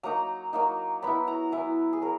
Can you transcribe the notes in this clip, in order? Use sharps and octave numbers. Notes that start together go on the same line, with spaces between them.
F#3 A#3 D#4 A#5
F#3 A#3 D#4
F#3 B3 E4 B5
A#5
F#3 B3 E4 G#5
G#4
F#3 A#4